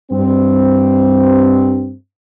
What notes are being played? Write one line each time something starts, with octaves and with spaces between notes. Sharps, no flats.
G2 C4